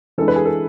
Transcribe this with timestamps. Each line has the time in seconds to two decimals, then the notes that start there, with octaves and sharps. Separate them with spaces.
0.18 E3 G#3 D4 A4
0.28 B4
0.36 G#4
0.45 A4